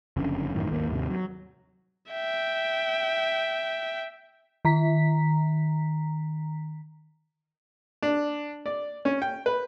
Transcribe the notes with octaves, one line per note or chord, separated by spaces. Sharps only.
F#1 F2 D3 C#4
A1 F#2 A2 D#3
G#1 D#2 B2 A#3
D#2 G#2 C3
F#3
E5 G5
D#3 A#5 B6
D4
D5
C#4
G5
B4